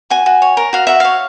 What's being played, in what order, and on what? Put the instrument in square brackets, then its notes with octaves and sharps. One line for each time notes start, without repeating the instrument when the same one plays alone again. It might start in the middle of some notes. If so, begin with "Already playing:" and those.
[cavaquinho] F#4 G#5
F#4
C#5
A#4
F#4 F5
F#4 E5
C#5 F5